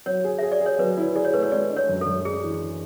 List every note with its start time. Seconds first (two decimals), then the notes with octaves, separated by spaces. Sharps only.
0.06 F#3 C#5
0.24 G#4
0.39 G#4 E5
0.52 D5
0.61 G#4
0.66 C#5
0.79 F#3 B4
0.97 E4
1.15 G#4 D5
1.24 C#5
1.34 A3 B4
1.43 C#5
1.52 G#3 D5
1.70 D4
1.76 C#5
1.89 F#2
2.01 A4
2.06 F#2
2.25 D4 G#4
2.43 E3